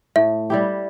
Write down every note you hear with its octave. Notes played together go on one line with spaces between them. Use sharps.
A2 E5
G3 E4 G4